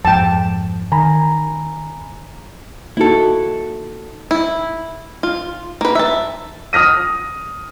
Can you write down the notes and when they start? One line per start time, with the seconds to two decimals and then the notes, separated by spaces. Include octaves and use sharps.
0.05 F2 G#2 G5 A5
0.92 D#3 G#5 A#5 B5
2.97 A#3 D#4 E4 F#4 A4
4.31 E4
5.23 F4
5.81 A#3 B4
5.95 E5 A5
6.73 D#6 F6 A#6 D#7